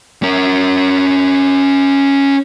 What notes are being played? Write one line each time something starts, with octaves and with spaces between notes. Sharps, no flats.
C#4 A#4